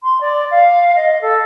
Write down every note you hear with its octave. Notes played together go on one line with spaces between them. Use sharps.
C6
D5
F5
D#5
A4